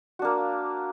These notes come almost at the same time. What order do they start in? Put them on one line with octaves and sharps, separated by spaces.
F#4 D4 A#3